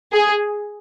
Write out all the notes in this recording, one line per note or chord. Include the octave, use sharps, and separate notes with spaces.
G#4